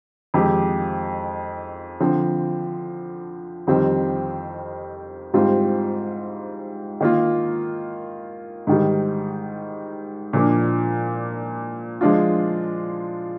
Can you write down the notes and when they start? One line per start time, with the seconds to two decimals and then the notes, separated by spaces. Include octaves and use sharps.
0.34 F2 D#3 G#3 D#4 G4
2.00 D3 F3 C4
3.67 F2 D#3 G3 C4
5.34 G#2 G3 C4 F4
7.01 D#3 A#3 F4
8.67 G#2 D#3 G3
10.33 A#2 F3 A#3 D4
12.01 F3 G#3 D4 F4